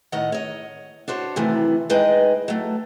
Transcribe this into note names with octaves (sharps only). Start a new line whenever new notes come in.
A2 D#3 C#5 D#5 F#5
C#5 D#5
D4 F#4 C5 C#5
C3 D#3 E3 F#3 A3 B3
G#3 D#4 B4 C#5 D#5 G5
F#3 A3